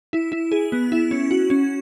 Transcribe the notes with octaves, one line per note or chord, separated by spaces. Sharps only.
E4
E4
G#4
B3
E4
C#4
F#4
C#4